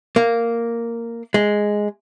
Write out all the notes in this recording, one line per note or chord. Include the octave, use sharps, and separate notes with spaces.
A#3
G#3